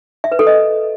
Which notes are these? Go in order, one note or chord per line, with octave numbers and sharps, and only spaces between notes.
E5
B4
A4
D#5